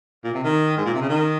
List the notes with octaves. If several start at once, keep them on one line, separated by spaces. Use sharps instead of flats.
A#2
C3
D#3
G#2
A#2
C3
C#3
D#3